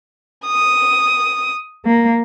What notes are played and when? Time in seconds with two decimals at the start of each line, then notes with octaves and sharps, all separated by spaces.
0.47 D#6
1.86 A#3